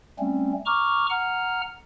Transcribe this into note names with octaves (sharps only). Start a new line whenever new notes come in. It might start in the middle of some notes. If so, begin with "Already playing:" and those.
G3 A3 C4 C#4
A#5 C#6 D6 F6
F#5 A#5 F6